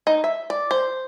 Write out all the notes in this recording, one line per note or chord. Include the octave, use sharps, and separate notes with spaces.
D#4
E5
D5
C5